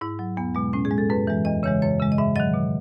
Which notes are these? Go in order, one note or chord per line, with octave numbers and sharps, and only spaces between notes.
G#2 E4
F#3
E2 B3
B2 G#3
A2 C#4
G#4
G#3
A4
F#2 B4
E3 G#3
E2 D#5
C#3 E3 G#3 C#5
F#2 C#5
C#3 G#3
D#5
G#2 E5
D#3 F#3 D#5
B2